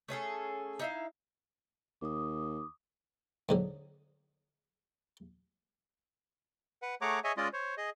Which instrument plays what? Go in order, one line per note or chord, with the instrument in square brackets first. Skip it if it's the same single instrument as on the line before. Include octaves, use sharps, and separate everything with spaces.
[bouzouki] A3 C#4 G#4 A4
D#4 E4 F5
[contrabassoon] D#2 [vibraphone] D6 D#6
[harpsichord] G#2 D3 F#3
[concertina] B4 F#5
A3 G#4 C#5 F#5 A#5 D6
G#4 C#5 D#5 E5 G#5
G#3 C#4 F4 D5 D#5
C5 C#5
G#4 D#5